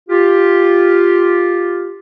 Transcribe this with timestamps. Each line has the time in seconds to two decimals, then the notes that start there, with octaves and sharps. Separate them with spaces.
0.09 F4 G4